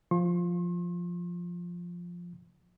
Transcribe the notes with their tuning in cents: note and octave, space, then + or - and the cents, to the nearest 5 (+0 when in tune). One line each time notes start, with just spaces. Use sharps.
F3 +0 C6 +40